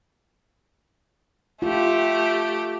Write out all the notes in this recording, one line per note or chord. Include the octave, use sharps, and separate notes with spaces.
A3 F4 G4